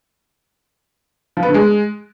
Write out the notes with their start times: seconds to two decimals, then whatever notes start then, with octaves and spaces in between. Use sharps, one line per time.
1.37 F3
1.43 B3
1.49 D3
1.54 G#3